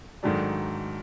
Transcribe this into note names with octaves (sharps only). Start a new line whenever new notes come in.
G#2 D#3 F#3 A3 D4